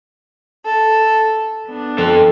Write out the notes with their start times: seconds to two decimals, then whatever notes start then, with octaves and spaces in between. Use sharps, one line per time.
0.66 A4
1.67 B3 D4
1.98 F3 A4 C5